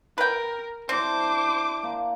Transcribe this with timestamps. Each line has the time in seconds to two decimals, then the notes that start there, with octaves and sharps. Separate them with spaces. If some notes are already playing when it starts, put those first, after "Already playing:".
0.18 A#4 B4 G5
0.89 C4 D4 E4 C5 D6
1.83 A#3